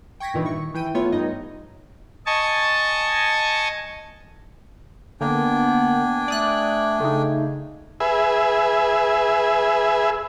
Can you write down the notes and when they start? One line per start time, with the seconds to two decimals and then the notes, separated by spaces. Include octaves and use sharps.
0.20 G5 C#6 G#6 A#6 B6
0.34 G2 A#2 D#3 E3
0.46 C#6
0.74 E3 G5 D#7
0.94 A3 B3 F4 C#5
1.12 G2 D#4 D#5
2.26 D#5 G#5 A5 C#6
5.21 D3 A#3 B3 D4 G5 G#5
6.28 A3 D5 D#6 F#6
7.00 C#3 A3 D#4
8.00 G#4 B4 E5